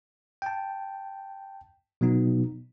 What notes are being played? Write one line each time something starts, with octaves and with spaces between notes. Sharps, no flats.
G5 A5
B2 F#3 B3 D#4